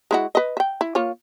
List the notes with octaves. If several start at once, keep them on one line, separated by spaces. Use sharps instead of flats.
G#3 E4 F#4
B4 D#5
E5 G5
E4
A#3 F4 C#5